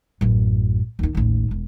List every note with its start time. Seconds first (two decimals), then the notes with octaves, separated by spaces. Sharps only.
0.21 A1 F#2
0.99 D#2 D#3
1.15 A1 D#2
1.51 E1